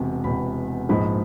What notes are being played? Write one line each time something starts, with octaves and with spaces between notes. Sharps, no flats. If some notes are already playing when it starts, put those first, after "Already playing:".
Already playing: E1 E2 C3
E1 E2 C3 B5
A#1 G#2 F3 G#3 B5